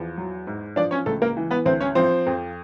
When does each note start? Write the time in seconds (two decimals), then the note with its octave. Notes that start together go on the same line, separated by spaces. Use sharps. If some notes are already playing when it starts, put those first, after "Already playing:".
Already playing: E2 F3
0.18 F#3
0.47 G#2
0.76 F3 D4 D5
0.91 C#4 C#5
1.06 C#2 A3 A4
1.22 A#3 A#4
1.37 E3
1.51 B3 B4
1.66 D2 C4 C5
1.81 C#4 C#5
1.95 F3 C4 C5
2.26 F2